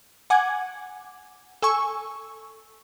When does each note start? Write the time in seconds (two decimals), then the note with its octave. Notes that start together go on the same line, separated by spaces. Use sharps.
0.30 F#5 G#5 D6 G#6
1.62 A4 G#5 C#6 E6